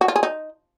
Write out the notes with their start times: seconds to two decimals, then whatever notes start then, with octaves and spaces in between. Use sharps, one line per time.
0.01 F#4
0.08 F4
0.16 G#4
0.23 D#4